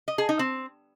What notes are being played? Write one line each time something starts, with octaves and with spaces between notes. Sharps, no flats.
D#5
G#4
D#4
C4